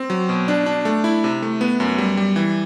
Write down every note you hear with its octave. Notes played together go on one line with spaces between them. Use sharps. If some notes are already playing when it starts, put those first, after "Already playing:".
Already playing: C4
F#3
B2
D4
D4
A3
E4
C3
A3
B3
F#2
G3
G3
E3